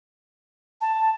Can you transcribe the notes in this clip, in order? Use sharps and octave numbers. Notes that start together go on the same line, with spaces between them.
A5